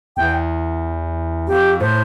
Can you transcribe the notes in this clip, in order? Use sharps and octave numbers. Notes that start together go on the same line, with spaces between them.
E2 G5
F2 G4
A2 C5